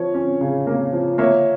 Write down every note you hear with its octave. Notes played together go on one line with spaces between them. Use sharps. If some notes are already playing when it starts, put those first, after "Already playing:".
Already playing: F3 C#5
C#4
C#3
A#3
F3
A#3 C#5 E5